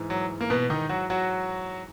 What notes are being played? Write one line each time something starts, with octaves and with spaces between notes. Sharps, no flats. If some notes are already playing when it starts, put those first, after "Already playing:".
Already playing: G#2 E3
F#3
A#3
B2 B3
D#3 D#4
F#3 F#4
F#3 F#4